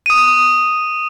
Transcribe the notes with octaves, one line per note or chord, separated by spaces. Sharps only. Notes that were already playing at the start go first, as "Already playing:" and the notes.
D#6 D#7